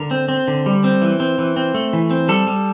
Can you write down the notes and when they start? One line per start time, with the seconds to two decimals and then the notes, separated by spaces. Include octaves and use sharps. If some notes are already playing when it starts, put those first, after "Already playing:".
Already playing: D3 A#4
0.11 C4
0.29 C4
0.48 D3
0.66 G3
0.84 C4
1.02 E3
1.20 C4
1.38 E3
1.56 C4
1.75 A3
1.93 E3
2.11 C4
2.29 G3 A4
2.47 G3